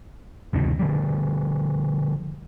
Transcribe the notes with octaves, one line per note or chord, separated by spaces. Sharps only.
F#1 D2 C3 D#3
D3 F3 G3